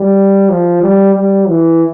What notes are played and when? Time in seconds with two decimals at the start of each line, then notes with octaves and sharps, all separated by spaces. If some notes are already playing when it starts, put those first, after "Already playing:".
Already playing: G3
0.50 F3
0.82 G3
1.15 G3
1.49 E3